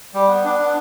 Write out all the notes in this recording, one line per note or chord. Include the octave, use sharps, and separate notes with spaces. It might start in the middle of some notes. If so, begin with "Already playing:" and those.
G3
B3
D4
B3